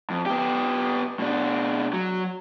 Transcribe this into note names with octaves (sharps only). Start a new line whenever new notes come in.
F2
B3 G4
B2 D4
F#3